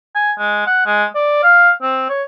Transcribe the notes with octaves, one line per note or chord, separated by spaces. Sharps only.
G#5
G#3
F#5
G#3
D5
F5
C4
C#5